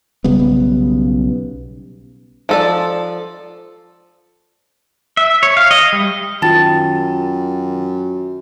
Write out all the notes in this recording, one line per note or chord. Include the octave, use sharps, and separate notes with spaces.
B1 C#3 G3 B3
F3 A4 D5
E5
C#5
F5
D#5
G3
F#2 D#3 F4 G5 A5 A6